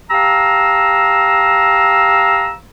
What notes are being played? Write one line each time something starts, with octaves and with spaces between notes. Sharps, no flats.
G4 F5 A5 A#5 E6